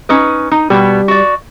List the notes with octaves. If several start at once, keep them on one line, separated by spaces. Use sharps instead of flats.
C#4 D#4 B4
D#4
B2 G3 B3
F#4 D5